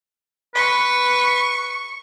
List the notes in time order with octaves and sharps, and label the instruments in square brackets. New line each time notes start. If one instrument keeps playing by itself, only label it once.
[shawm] B4 [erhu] C#6